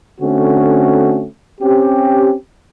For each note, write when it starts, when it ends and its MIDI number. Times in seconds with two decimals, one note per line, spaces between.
0.21 1.25 50
0.21 1.25 57
0.21 1.25 60
0.21 1.25 61
0.21 1.25 66
1.61 2.34 60
1.61 2.34 61
1.61 2.34 67